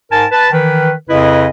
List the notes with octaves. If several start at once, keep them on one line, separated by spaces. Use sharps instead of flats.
G#2 A#4 G#5 A5
B4 A5
D#3 E3 B4
F2 C#3 E4 B4 D#5